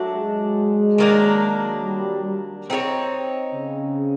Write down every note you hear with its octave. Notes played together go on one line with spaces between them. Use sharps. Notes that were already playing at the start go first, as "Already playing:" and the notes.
Already playing: F#3 A3 D4 F#4
G#3
D#3 F#3 A#3 D4
G3
C4 D#4 G#4 C#5
C#3